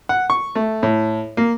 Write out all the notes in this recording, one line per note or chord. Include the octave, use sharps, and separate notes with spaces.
F#5
C#6
A3
A2
A#3